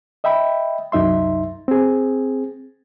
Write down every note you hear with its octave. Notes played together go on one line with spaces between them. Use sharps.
D#5 E5 G5 B5
C2 F#2 D#4 E5 C6
C4 G#4